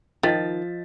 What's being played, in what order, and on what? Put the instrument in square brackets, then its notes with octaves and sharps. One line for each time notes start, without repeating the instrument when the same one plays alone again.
[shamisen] D#3 [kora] F3 [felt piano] D#5 A6 B6